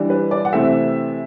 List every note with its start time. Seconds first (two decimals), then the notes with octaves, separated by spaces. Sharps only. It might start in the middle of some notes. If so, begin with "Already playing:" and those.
Already playing: E3 G3 D4
0.10 B4
0.31 D5
0.45 F#5
0.53 C3 E3 A3 C4 E5